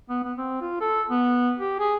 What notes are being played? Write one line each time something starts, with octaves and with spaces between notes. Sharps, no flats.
B3
B3
C4
F4
A4
B3
G4
G#4